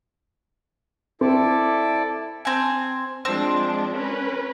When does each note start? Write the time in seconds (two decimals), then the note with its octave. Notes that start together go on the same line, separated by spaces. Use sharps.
1.21 C4 E4 A4 D5
2.45 C4 G#5
3.25 F3 G#3 C4 D4
3.93 C#4 A#4 B4